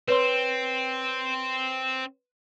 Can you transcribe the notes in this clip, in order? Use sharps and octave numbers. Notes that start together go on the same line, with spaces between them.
C4 B4 C#5 C6